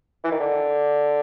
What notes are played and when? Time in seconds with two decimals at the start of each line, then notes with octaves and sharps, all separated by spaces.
0.24 E3
0.31 D#3
0.40 D3